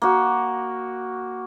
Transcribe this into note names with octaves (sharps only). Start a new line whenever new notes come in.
A#3 F#4